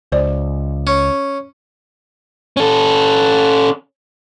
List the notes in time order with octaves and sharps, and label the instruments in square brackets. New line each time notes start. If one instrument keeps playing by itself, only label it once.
[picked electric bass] C#2 [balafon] C5 D5
[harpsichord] C#4
[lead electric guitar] C#4 A4